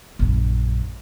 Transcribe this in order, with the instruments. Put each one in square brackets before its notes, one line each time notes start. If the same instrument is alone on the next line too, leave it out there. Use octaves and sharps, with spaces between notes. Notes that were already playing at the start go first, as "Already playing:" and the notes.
[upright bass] A#1 F#2